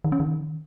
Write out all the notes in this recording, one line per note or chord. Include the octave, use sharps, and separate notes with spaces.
D#3
C#4
D#3